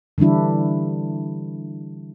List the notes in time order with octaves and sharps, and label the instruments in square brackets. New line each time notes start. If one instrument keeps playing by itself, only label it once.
[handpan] D3 E3 G3 D4 E4